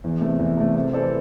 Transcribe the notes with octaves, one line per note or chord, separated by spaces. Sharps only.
E2
C3 A3
E2
C3 A3
C3
E3 C4 A4 D5